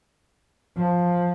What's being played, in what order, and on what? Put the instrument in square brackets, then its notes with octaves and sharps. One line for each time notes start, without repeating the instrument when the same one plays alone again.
[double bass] F3